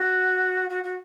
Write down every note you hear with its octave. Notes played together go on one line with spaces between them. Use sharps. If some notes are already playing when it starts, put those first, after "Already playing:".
Already playing: F#4
F#4
F#4